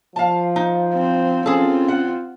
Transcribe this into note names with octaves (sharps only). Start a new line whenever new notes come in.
F3 F5 A5
D#4
C4
C4 C#4 F4 G#4 A4
F#5